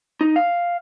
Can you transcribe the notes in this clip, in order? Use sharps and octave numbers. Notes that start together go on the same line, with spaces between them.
D#4
F5